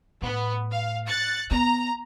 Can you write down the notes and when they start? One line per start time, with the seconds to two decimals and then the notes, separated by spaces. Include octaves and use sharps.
0.22 A2 B3
0.70 F5
1.08 F#6 A6 C#7
1.51 B3 A#5